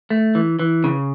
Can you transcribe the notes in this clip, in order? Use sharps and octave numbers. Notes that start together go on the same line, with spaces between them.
A3
E3
E3
C#3